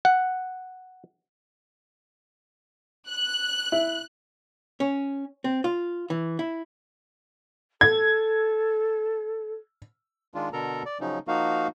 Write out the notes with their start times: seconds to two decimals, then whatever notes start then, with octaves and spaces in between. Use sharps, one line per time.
0.05 F#5
3.09 F#6
3.72 E4
4.80 C#4
5.44 C4
5.64 F4
6.10 E3
6.39 E4
7.81 A4 G#6
10.34 D#3 G#3 D4 F4
10.53 B2 D3 A4 A#4 A#5
10.86 D5
11.01 C#3 F3 F#3 C#4 D#4
11.28 F3 A#3 D#4 F#4 F5